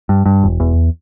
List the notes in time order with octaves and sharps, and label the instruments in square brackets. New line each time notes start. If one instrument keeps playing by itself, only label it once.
[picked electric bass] G2
G2
E1
E2